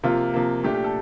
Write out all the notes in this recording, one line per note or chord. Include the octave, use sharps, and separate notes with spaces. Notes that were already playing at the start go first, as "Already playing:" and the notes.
C3 F3 A#3 F4
C3 F3 A#3
A#2 A3 D4 G4
G4
A4